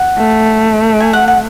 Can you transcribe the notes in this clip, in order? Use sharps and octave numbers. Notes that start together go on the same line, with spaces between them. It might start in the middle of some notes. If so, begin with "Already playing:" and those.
Already playing: F#5
A3
G#5
F#5
F#5